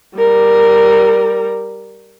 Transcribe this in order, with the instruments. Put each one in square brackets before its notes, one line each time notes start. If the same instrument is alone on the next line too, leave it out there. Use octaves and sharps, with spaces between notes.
[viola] G3 A#4